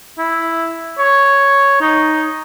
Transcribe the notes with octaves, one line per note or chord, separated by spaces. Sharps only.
E4
C#5
D#4